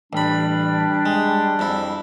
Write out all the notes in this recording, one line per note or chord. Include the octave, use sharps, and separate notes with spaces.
A1 G3 D4 B5
G#3
F2 E4